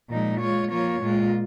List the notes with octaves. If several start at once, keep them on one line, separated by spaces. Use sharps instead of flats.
A#2 F3 G#3 D#4
G#3 F4 C#5
F3 A#3 F4 C#5
A#2 G#3 F4